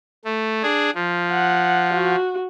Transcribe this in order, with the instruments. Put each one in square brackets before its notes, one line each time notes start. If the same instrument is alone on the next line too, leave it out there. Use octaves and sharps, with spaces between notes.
[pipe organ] A3
D4 G#4
F3
[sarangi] F#5
F#4